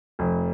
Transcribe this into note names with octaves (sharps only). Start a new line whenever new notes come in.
F1